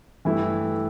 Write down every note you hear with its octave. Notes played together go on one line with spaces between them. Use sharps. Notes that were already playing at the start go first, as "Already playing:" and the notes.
G2 E3 A3 E4 G4